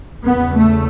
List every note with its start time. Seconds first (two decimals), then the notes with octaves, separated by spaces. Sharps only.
0.24 E2 C#3 B3
0.53 A3